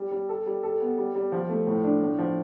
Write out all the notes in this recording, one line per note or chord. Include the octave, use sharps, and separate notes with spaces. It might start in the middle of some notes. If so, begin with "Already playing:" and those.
Already playing: G3
G3
A4
G3
A4
B3
G3
G3
F3
A3
A2
D4
A2
F3